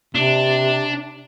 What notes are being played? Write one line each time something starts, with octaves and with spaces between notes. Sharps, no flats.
C3 D4